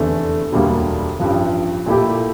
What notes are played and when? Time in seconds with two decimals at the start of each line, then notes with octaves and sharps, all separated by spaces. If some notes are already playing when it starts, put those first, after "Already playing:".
Already playing: F1 E2 D3 A3
0.52 E1 D2 D3 G3 A#3
1.19 A1 G2 F3
1.86 A#2 A3 E4 G4